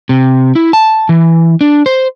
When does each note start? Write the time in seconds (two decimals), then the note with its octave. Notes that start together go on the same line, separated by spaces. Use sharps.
0.09 C3
0.55 E4
0.73 A5
1.09 E3
1.61 D4
1.86 C5